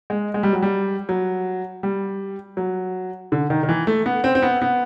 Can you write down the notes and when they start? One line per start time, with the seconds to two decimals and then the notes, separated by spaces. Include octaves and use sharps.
0.10 G#3
0.34 G#3
0.43 G3
0.53 F#3
0.62 G3
1.09 F#3
1.83 G3
2.57 F#3
3.32 D3
3.50 D#3
3.63 D#3
3.69 E3
3.87 A3
4.06 B3
4.24 C4
4.35 C4
4.42 B3
4.62 B3